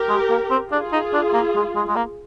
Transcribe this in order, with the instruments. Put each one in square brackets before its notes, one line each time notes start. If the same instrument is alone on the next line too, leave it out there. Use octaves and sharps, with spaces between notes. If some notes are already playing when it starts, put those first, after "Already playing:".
Already playing: [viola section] G4 A#4
[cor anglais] G#3
A#3
C4
[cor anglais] D4 [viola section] F4 G#4
[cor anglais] D#4
D4
A#3
G#3
G#3
G#3
A#3